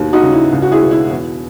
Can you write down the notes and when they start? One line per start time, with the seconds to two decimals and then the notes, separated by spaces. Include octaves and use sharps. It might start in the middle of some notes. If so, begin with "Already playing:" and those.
Already playing: D#2 B2
0.13 D#4 F#4
0.23 C#3
0.32 E4
0.52 C#2
0.62 F#4
0.72 E4 G#4
0.82 B2
0.91 E4
1.11 E2